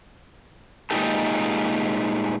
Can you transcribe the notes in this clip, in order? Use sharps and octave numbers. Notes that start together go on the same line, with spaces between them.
A#2 D3 G#3 D#4 G4 A4